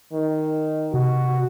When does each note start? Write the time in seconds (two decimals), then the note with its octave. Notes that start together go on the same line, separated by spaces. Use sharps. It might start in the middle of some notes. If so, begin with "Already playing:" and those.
0.13 D#3
0.94 C3 F#4